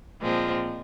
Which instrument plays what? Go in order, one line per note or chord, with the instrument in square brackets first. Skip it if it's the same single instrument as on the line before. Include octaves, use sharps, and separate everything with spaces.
[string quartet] A#2 F3 G#3 C4